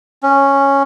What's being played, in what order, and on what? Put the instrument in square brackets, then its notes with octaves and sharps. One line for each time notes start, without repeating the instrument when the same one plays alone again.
[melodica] C#4